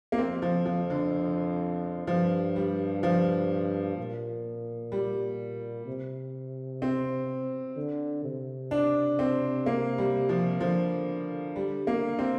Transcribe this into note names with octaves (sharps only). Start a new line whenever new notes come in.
A#3
F2 C4
F3
F3
D3
G2 F3
G3
F3
A#2
G3
C3
C4
D3
C3
D4
C4
A#3
G3
F3
D3 F3
G3
A#3
C4